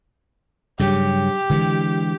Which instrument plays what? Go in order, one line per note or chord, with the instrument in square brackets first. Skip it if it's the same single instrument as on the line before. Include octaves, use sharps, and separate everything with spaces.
[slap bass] G2 C#3 F#3 [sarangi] G4
[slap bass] D3 E3 G#3